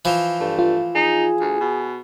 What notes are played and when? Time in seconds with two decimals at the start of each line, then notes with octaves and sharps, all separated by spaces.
0.05 E3 F3
0.41 G2 A3
0.59 F4
0.95 D#4 G#4
1.41 D2
1.60 B2